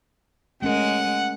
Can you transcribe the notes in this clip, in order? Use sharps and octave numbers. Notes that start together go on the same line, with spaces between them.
G#3 A3 C#4 A#4 F#5